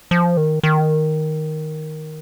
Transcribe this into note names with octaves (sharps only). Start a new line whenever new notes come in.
F3
D#3
D#3